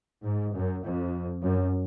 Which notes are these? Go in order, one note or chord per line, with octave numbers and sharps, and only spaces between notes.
G#2
F#2
F2
F#2